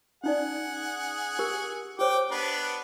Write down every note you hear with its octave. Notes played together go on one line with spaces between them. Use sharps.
C#4 D#4 G#4 D5 F#5
G4 A#4
G4 C5 C#5 G5 D6
B3 D4 B4